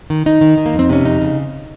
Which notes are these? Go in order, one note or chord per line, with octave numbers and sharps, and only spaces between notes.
D#3
D#3 D#4
D#3
D#3
A#3
F2
C4
C3 C#4
F2 D#4
C#3